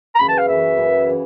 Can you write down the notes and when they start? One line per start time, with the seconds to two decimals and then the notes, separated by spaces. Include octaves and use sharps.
0.15 A#5
0.19 F#2 C#3 E3 B5
0.29 A5
0.38 F5
0.48 F#2 C#3 E3 E5
0.77 F#2 C#3 E3
1.09 C#3 E3